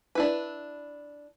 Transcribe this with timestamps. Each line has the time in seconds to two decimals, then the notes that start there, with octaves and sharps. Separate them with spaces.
0.15 D4 E4 B4